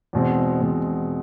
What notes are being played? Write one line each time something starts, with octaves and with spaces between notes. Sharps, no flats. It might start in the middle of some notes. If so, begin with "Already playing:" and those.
E2 B2 G#3 C4
E2 B2 G#3 C4